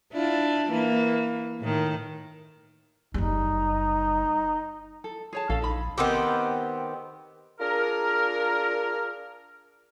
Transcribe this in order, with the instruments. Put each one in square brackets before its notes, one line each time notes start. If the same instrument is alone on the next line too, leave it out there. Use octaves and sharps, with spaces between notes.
[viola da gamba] D4 E4 F4
E3 A#3
A2 D#3
[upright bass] F#1 G3 [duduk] D#4
[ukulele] A4
G#4 C#5 A5
[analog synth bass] A#1 [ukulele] C#4 A4 F5
[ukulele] D#4 B5
[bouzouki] D#3 B3 C4 G4
[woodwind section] D4 F4 G#4 A#4